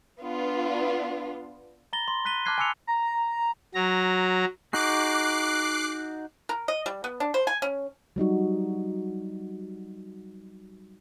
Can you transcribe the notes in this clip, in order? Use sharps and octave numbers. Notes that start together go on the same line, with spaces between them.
B3 D4 F4
A#5 B5 A6 A#6 G7
C6
B5 F#6 B6 D#7 G7
A5 D6 F6 F#6 G#6 C7
G#5 B5 D6 E6 C#7 F7
A#5
F#3 A#5
D#4 F#4 G#4 D6 F#6 C7
A#4
D#5
G3
B3
D4
C5
G#5
C#4
F#3 G3 D#4 F#4